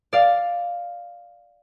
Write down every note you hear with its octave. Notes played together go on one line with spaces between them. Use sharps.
D5 F5